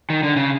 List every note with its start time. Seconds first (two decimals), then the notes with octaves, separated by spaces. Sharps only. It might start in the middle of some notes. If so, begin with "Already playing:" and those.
0.10 D#3
0.23 D3
0.36 C#3